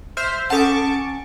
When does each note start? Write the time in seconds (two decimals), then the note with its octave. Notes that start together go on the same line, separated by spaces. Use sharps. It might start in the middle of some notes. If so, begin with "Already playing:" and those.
0.17 C5 E5 F6
0.50 C#4 A4 F#5 A5 C#6 D6